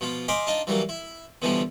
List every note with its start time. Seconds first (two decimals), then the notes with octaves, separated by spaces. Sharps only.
0.01 B2 F3 F4
0.28 C5 D#5 F5 G#5 B5 D6
0.47 D4 D#4 F4 D#5
0.67 E3 F#3 G3 A#3
0.89 E4
1.42 B2 D3 E3 F3 G3 D4